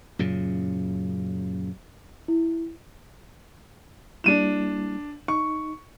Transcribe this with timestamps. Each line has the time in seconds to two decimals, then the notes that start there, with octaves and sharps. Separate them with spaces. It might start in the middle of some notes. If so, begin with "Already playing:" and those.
0.19 F#2 A#2 C#3
2.28 E4
4.24 G3 A#3 D4 E4 D#7 E7
5.28 D#4 C#6